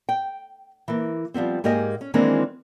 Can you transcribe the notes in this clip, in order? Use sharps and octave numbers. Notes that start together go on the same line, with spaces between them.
G5
E3 A#3
F3 G3 B3 C4
G#2 A#3 G4 G#4 D#5 G#5
C#4
D#3 E3 G#3 A#3 C4 D4